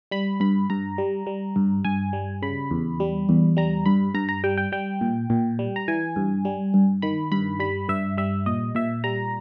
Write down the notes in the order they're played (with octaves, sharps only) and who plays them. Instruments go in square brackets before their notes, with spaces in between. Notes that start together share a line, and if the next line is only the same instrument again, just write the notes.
[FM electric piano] G3 B5
G2 B5
G2 A#5
G3
G3
G2
G2 G#5
G3
C#3 B5
E2
G3
E2
G3 A#5
G2 B5
G2 A#5
A#5
G3 G5
G5
G3 G5
A#2
A#2
G3
A#5
E3 G#5
G2
G3
G2
D#3 B5
G2 B5
G3 B5
G2 E5
G3 E5
A#2 D#5
A#2 E5
G3 A#5